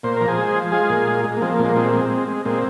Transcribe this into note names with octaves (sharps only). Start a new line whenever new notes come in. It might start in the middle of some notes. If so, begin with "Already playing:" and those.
A#2 C5
F3 A#4
G#4 C5
G#3
F3
G#3 F4 G#4
A#2
G#3
G#3
A#3
F3 G#3 C4
A#3
A#2
G#3
G#3 C4
G#3
G#3
G#3
A#2 G#3 C4